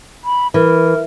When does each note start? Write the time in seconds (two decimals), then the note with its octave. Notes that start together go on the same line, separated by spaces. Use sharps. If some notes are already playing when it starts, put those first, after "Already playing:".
0.24 B5
0.54 E3 A#4